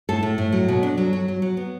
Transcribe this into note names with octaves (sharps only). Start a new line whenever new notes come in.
A2 A4
A2
A2
F#3
B2
D4
F#3
F#3
F#3
F#3
B3